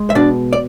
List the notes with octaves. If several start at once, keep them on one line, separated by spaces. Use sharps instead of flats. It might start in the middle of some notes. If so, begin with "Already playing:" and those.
Already playing: G#3
E5
B2 D4 D5
D5